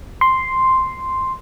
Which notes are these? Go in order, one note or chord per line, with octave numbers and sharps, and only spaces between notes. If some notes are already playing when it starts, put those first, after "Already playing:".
C6